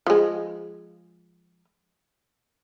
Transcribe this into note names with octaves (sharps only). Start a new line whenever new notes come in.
F3 G#3